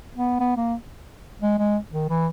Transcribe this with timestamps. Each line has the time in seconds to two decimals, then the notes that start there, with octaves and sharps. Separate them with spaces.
0.15 B3
0.40 B3
0.57 A#3
1.42 G#3
1.59 G#3
1.91 D#3
2.09 E3